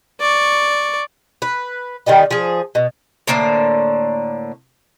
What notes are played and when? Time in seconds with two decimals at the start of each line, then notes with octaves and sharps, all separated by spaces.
0.21 D5 C#6
1.42 B4
2.06 D#3 G3 B3 D#5
2.31 F3 G#4
2.75 B2
3.27 A2 D3 A#3 C5